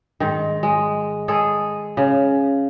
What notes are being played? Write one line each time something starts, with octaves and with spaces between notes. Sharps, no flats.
G#2 D#3
G#3
G#3 G#4 A4
C#3